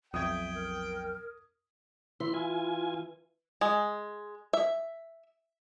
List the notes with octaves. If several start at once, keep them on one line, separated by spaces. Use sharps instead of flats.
B1 F2 E5 G5 D#6 G#6
A#4
E3 E4 C6
F4 G#5
G#3
E5